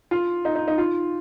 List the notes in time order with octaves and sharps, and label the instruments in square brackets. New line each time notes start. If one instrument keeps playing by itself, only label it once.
[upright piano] F4
D#4
D#4
D#4
F4